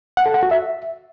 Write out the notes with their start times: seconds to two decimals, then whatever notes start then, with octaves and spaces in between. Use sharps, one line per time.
0.17 F#5
0.26 A4
0.34 F#5
0.43 F#4
0.51 E5